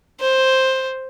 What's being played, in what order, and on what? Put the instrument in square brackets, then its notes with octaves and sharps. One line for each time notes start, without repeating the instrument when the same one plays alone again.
[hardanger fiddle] C5